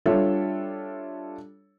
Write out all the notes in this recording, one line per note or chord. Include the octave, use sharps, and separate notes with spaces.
G3 D4 F4 A4 C#5 E5